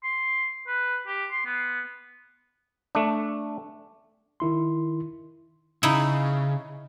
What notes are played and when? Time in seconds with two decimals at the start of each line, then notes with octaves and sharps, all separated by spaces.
0.04 C6
0.67 B4
1.07 G4
1.31 C6
1.46 B3
2.95 A3 D4
4.40 D#3 E4 C6
5.83 C#3 D#4 E4